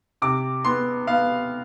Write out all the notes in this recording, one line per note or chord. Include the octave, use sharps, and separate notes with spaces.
C3 D6
B3 C6
B3 F5